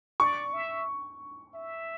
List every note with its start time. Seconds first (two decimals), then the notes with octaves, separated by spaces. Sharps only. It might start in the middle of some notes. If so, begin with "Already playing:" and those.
0.20 D5 C#6
0.53 E5
1.55 E5